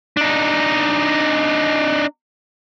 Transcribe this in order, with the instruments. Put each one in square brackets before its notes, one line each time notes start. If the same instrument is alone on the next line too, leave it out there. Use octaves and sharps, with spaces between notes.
[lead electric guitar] D4 D#4